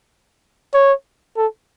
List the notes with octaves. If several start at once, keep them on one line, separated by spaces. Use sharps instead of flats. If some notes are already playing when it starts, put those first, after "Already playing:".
C#5
A4